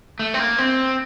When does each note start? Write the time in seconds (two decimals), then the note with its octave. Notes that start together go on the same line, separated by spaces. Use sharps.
0.19 A3
0.34 C4
0.39 A#3
0.58 C4